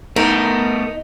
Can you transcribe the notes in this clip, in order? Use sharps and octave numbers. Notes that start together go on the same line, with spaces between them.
A3 B3 D#4 A#4